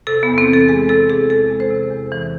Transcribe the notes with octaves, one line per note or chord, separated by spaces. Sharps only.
C3 A4
E2 B3
C4
E3 A4
G#3 G#4
C3 A4
E2 G#4
E3 A4
G#3
C5
C3
E2
E3